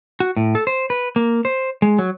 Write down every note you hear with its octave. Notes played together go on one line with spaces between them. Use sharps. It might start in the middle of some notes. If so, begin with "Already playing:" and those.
F#4
A2
A4
C5
B4
A#3
C5
G#3
F#3